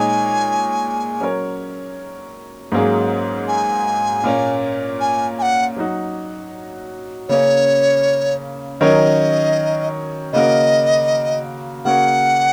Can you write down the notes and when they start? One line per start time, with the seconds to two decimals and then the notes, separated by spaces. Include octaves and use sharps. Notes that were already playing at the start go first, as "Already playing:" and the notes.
Already playing: A#2 G#3 D#4 G#4 C#5 G#5
1.20 F#3 C#4 A#4 C#5
2.72 G#2 F#3 A#3 C#4 G#4
3.48 G#5
4.24 A#2 A#3 C#4
5.00 G#5
5.39 G#5
5.42 F#5
5.77 F#3 D#4 F#4
7.29 C#3 A#3 C#4 C#5
8.81 D#3 F#3 C#4 A#4 C#5 D#5
10.33 C#3 A#3 F#4 A#4 D#5
11.85 C#3 A#3 F#4 A#4 C#5 F#5